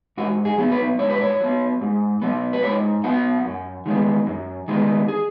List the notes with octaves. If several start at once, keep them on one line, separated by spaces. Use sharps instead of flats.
G#2 F#4
G#4
F#3 B3
B4
G#2 C#5
B4
C#5
F#3 B3
G#2
F#3 B3
B4
G#2 C#5
F#3 B3 F#5
F#2
D#3 G#3 B3
F#2
D#3 G#3 B3
G#4